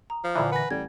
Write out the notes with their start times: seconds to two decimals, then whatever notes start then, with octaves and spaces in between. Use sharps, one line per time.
0.10 A#5 D#6
0.24 F3
0.35 A#2 D3 E3 A#5
0.52 B4 F#5 G#5 A#6
0.71 A1 G3 G#6